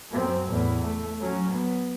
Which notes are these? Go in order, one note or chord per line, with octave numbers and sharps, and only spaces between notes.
F#2 C4
E2 A2
A3
F#3 C#4
B3